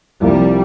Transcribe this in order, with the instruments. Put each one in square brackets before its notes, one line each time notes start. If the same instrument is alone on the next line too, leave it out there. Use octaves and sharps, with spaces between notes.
[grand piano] C2 C3 F3 A#3 [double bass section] G3